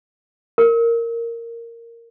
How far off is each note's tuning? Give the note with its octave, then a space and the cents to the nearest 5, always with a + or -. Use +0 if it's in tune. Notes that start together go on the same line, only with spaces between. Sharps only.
A#4 -10